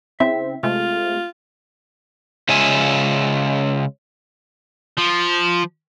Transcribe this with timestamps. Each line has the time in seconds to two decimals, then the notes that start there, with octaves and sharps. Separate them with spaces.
0.20 C#3 C4 E4 E5
0.63 C3 G#3 A3 F4
2.49 C#3 G#3 F4 E5 G#5
4.97 F3